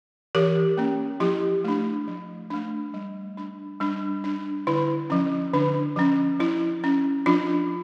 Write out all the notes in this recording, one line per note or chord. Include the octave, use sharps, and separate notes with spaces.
E3 G4 A#4
A#3 C#4
F3 E4 G4
A3 D4
F3
A3 D4
G3
D4
G3 D4
D4
D3 E4
F3 C#4
D3 D4
F3 C#4
F3 E4
C#4
F3 D4 F4